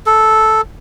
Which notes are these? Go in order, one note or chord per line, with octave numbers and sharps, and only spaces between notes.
A4